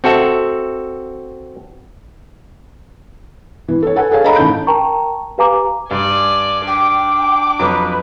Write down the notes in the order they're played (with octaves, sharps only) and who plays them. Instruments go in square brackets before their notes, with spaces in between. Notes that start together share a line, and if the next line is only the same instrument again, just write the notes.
[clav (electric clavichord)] C4 F#4 A4 E5
[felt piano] E3
A4 C#5
A4 B4 F#5 G#5
G#4 A4 C#5 F5 G#5
A4 C#5 D#5 F5 A#5 B5
A1 D#3 A5 B5 G6 D7
[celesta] A#4 G5 A5 A#5 C#6
G4 B4 F5 G#5 A#5 D6
[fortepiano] G2 [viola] D5 G#5
[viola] D4 [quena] G5 [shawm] D6
[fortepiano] F2 F#3 [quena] B4